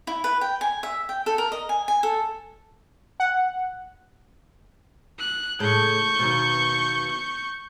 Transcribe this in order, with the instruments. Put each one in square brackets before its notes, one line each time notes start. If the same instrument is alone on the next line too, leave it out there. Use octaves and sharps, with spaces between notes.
[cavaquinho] E4
B4
G5
G#5
E5
G5
A4
A#4
D#5
G#5
G#5
A4
[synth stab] F#5
[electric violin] F#6
[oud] A2 C#3 [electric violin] C#6 G6
[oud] D#2 B2